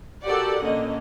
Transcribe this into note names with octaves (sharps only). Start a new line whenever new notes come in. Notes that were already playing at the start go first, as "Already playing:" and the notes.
F#4 G4 A4 A#4 D5 F#5
A#1 D3 A#3 C#4 D#5